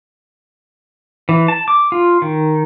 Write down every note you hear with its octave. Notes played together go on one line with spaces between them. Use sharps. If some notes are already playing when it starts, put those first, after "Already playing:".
E3
A5
D6
F4
D#3